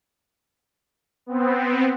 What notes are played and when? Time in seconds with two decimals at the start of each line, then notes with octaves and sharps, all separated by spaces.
1.26 B3 C4